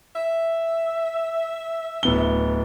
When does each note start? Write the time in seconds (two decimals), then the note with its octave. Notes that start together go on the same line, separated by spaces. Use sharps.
0.16 E5
2.03 D1 B3 G7